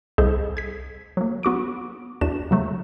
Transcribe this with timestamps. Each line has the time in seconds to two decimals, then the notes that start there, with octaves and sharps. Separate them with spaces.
0.18 C2 G#4 A4 C5 D#5
0.57 G#6 B6
1.17 F#3 A#3
1.43 B3 F#4 D6 D7
2.21 E2 D4 F#4 E7
2.51 C#3 F#3 A3